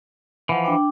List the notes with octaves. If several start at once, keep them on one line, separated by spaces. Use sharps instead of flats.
E3 F3 F#5
D4 G5 D6